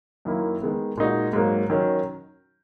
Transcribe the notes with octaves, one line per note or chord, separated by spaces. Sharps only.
F#2 D#3 A#3 E4
D#3 G#3 B3
A#2 G#3 D#4 F#4
G#2 F#3 A#3
D#3 F#3 C#4